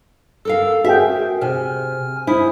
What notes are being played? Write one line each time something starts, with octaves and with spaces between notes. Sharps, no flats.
A4 A#4 F5 E6
F#4 G#4 A#4 E5 G5
C3 G#5 F6
E4 C5 G#5 D#6